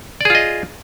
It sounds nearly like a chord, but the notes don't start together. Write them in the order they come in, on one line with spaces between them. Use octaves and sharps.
D5 G#4 F4 D#5